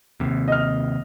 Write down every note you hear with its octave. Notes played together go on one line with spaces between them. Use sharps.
D#2 C3
D#5 F6